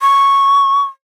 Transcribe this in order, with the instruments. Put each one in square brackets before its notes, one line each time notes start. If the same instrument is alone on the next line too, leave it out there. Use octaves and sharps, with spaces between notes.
[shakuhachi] C#6